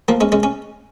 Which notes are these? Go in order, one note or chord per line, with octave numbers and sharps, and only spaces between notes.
F3 A#3
G#3 C#4
G#3 C#4
C#4